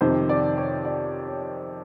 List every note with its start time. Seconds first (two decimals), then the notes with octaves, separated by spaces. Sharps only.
0.01 F2 C3 D#3 C5
0.29 D5
0.58 C#5
0.85 D5
1.27 C#5